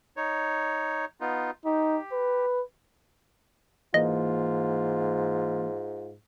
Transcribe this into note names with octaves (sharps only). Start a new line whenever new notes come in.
D#4 C#5
B3 D#4 F4
D#4 G4
B4
G#2 E3 A#3 F4 D#5